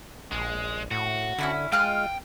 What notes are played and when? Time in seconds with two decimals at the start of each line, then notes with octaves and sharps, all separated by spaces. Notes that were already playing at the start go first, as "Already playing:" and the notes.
0.32 A#1 G#3
0.91 A2 F#4
1.39 D3 C#4 D#4 E4
1.72 G#3 F4 G5 F6 F#6